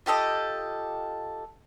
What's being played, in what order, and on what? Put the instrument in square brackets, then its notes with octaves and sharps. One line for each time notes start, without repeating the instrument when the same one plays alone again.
[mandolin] F4 G4 A4 D#5